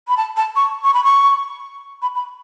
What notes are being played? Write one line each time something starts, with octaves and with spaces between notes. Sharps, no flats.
B5
A5
A5
C#6
C#6
B5
C#6
B5
B5